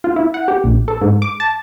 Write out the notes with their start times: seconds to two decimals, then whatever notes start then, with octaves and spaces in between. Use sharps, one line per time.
0.04 F4
0.16 E4
0.34 F#5
0.48 G4
0.64 A#1
0.88 A4
1.01 G#2
1.22 D6
1.40 A5